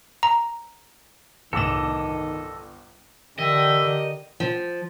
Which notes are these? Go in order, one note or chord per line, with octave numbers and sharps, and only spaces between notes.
A#5
G1 C2 A2 D#3 A4 D#5 D6 E7
D3 G4 A#4 D#5 E5 G5
F3